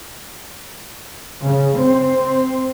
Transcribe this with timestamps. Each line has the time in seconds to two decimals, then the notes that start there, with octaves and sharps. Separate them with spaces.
1.45 C#3
1.78 C4